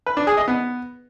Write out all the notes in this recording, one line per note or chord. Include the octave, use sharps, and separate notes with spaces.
B4
D4
G#4
D#5
B3